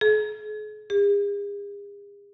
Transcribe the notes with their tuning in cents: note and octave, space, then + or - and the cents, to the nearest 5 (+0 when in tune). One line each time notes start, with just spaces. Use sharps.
G#4 +40
G#4 -45